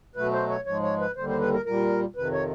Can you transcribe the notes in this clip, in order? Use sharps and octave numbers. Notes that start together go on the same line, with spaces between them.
B2 F#3 A3 B4
C5
C#5
G#2 F3 G#3 C#5
C#5
B4
D#2 D3 G3 C5
C5
B4
A#4
A#2 G3 A#4
F2 C3 D#3 B4
C#5